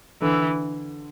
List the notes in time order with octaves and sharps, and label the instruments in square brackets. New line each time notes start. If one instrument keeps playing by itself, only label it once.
[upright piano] D3 [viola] E3